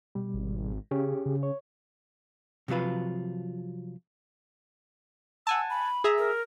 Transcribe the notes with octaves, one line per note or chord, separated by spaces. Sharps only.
B2 G3
G#1
C#3 C#4 G4 G#4
C#3
C#5
C3 F3 F#3 F4 B4
F#5 G#5 A5 E6
B5
G#4 E5 A#5
A#4